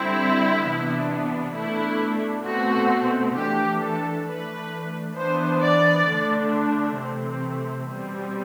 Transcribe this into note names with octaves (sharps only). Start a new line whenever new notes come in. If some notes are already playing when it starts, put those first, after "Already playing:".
Already playing: D3 G3 C4 E4
C3 E3 B3 D4
B2 A3 D4 E4
B2 A3 C4 F#4
E3 A3 D4 G4
A4
E3 A3 D4 B4
E3 B3 D4 C5
D5
D3 A3 D4
C3 E3 A3 C4
B2 G3 C4